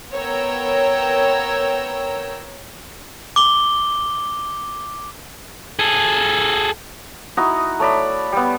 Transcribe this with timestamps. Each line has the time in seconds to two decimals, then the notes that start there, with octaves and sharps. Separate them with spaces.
0.12 B3 A#4 C#5 G5 A#5 E6
3.36 D6 G7
5.79 G#4 A4
7.37 D#4 E4 F#4 D#6
7.79 A3 C#5 D5 B5
8.32 G3 B3